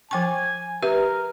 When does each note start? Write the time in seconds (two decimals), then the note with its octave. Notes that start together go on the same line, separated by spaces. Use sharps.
0.11 F3 G5 G#5 C#6
0.83 G4 A#4 B4 E5